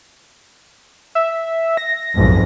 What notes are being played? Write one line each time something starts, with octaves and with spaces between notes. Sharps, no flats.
E5
A#6
B1 F2 G#2